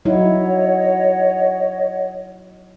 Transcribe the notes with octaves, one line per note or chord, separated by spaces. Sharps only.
F#3 D#4 E4 C#5 D#5 F#5